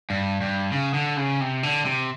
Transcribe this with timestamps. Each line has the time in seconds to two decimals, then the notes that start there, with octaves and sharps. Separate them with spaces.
0.10 G2
0.41 G2
0.72 C#3
0.94 D3
1.17 C#3
1.41 C3
1.63 D3
1.85 C3